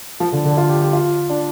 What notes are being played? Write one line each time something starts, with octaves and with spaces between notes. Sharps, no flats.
F3
D3
D3
F4
G4
G4
F4
D4